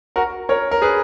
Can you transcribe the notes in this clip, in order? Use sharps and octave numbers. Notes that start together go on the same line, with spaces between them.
F#4 A#4
A#4 C#5
A#4
G#4 B4